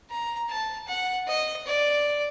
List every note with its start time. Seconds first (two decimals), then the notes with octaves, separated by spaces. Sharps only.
0.11 A#5
0.50 A5
0.88 F#5
1.28 D#5
1.67 D5